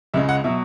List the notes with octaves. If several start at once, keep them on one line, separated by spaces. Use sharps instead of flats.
C#2 C#3 G#3 E5
F#5
B2 F#3 E5